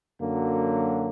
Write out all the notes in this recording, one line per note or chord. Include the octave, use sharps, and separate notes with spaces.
F#2 D3 F#3 A#3